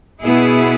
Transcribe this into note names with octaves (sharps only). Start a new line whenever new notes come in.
B2 B3 E4 G#4